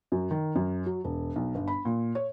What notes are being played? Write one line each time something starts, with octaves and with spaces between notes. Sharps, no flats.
F#2
D#3
F#2
F#3
E1
B1
G1
B5
A#2
C#5